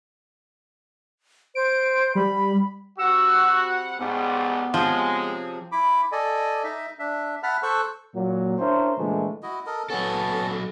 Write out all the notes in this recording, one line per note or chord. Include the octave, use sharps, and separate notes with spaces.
C5 D7
G3 B5
G3 C4 F#4 F#5 E6
A1 G#2 G3 B3
C3 F3 G#3 C#4 G#4
E4 B5 D6
A4 D5 D#5 G#5
D#4 D#5 E5
D4 E5
E5 F#5 A5 B5 F6 F#6
A4 C5 C#6 E6 F#6
A#2 F#3
C#4 D4 E4 A#4 C5
A#2 D3 E3 F3 G#3 A3
E4 F#4 D#5
A4 A#4 D#5
F#3 B3 C#4 A4 A5